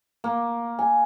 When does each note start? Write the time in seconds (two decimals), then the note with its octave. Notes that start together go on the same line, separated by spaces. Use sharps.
0.24 A#3
0.79 G#5